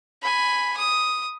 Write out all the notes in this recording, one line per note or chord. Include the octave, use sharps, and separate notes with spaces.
G#5 B5
D#6